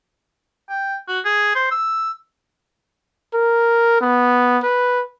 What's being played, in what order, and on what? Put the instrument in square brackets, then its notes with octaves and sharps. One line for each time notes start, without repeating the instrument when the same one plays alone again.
[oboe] G5
F#4
G#4
C5
E6
[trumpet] A#4
B3
B4